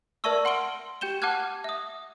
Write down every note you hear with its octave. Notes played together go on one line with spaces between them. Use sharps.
A#4 D5 E5 A5 C#6 E6
F#5 C6 F6 D7 G7
G4 G5 G6 E7 G7
F#5 A5 D6 F6 F#6 G#6
E5 D#6